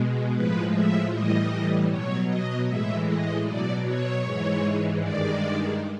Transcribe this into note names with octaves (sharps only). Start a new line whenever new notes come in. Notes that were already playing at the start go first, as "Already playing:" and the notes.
Already playing: B2 G#3
A2 F3 G#3 B4
E5
A2 E3 G3 D#5
B2 F#3 C#5
D#5
A2 E3 G#3 E5
D#5
B2 F#3 D5
C#5
G#2 E3 G#3
G2 D#3 G#3 D5